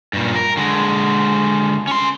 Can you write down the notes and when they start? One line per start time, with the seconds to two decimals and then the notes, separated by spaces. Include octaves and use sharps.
0.13 G2 A#2
0.35 A#4
0.57 D3 G#3
1.87 C#4 C6